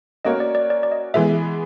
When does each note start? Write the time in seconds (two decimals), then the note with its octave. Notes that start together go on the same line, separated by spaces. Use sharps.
0.25 A#3 C#4 F#4 A#4 C#5 D#5
0.40 D5
0.55 D5
0.70 D5
0.83 D5
0.92 D#5
1.14 E3 G#3 B3 E5